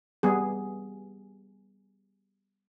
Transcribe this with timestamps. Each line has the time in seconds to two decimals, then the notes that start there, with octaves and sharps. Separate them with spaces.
0.23 G3 B3 G#4